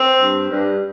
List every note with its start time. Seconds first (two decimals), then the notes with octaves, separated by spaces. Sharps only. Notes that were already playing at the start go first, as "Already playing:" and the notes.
Already playing: C4
0.20 G2
0.50 G2